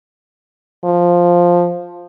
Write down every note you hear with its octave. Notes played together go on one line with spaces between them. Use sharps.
F3